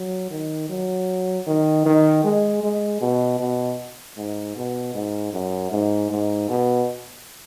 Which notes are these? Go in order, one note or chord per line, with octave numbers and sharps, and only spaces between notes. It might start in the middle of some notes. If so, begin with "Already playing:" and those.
Already playing: F#3
D#3
F#3
D#3
D#3
G#3
G#3
B2
B2
G#2
B2
G#2
F#2
G#2
G#2
B2